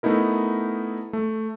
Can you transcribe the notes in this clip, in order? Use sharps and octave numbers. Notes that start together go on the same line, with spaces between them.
A3 B3 D#4 E4 A#4
A3